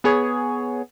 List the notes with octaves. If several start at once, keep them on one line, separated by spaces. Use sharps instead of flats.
B3 G#4 C#5